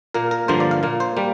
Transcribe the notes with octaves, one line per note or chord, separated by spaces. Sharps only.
A#2 A#3 A#4
A#4
G2 D3 F3 A#3 C5
D5
F5
A#2 A#3
C5
G3 A#3